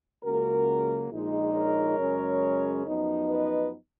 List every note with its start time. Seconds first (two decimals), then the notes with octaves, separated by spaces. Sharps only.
0.22 C#2 C#3 F#3 A#3 F#4 A#4
1.11 A#1 A#2 G#3 D#4
1.54 A#4 C#5
1.97 F#2 C#3 G#3 C#4
2.85 F#2 F3 B3 D#4
3.29 B4 D#5